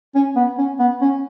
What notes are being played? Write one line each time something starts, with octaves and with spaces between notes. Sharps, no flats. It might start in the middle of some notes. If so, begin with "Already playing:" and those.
C#4
B3
C#4
B3
C#4